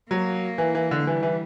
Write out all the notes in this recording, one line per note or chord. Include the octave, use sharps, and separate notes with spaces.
F#3 A#3
E3
E3
D3
E3 G3
E3